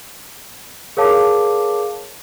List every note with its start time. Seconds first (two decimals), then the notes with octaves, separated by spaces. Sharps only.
0.97 G#4 A#4 C#5 F5 A5 D6